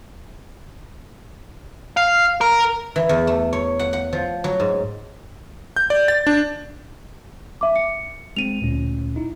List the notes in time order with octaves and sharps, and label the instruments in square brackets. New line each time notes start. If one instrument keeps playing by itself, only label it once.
[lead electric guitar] F5
A#4
[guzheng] E3
E2
A3
C#5
F#5
F#5
F3
F#3
G#2
[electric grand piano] G6
D5
A6
D4
[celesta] E5 D6
C#7
[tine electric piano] G#3 C4 [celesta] D#7 F7
[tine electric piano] D2 A#2 C#4
D#4 E4